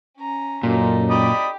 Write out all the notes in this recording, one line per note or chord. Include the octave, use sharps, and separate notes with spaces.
C#4 A#5
F#2 A#2 D#4 A4
G4 D5 D#5 B5